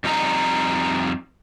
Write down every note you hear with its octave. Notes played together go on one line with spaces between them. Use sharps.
F2 G3 D#4 A#5